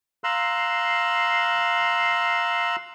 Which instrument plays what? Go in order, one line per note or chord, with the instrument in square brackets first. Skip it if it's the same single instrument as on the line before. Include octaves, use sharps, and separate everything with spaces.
[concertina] F5 A#5 C6 E6 F#6